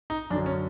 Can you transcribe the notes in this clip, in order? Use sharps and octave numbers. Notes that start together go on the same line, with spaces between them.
D#4
F#2 D3 F#3 D4
C#4